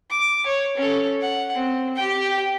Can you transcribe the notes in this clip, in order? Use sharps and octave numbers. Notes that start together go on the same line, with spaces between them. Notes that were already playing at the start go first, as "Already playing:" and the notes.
D6
C#5
C#4 A4
F#5
C4
G4 G5